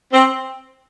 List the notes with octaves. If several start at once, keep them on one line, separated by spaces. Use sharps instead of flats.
C4